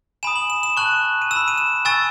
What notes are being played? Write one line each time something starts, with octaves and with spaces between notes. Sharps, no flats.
G#5 B5 D#6 E7
F#7
E7
E7
A5 C#6 F#6 F#7
D#7
E6 E7
B5
D#7
E7
G#5 C#6 E6 A6